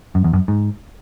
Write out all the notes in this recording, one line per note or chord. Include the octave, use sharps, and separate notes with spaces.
F#2
E2
F#2
G#2